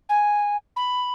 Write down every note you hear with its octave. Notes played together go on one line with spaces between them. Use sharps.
G#5
B5